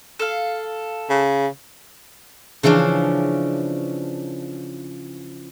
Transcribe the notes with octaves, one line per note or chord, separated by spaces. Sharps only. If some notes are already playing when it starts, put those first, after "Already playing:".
A4 F5
C#3
C#3 E3 F3 C#4 D4